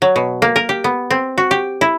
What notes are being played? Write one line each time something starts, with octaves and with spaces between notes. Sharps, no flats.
F#3
B2
A#3
A#4
G4
B3
C4
F#4
G4
E4